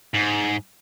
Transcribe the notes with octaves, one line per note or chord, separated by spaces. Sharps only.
G#2